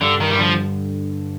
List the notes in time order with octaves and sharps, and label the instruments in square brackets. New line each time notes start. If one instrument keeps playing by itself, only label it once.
[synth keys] G2 [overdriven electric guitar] D3
[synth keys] G2 [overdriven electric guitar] D#3
[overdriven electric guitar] G3
[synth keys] D3 [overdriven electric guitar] F3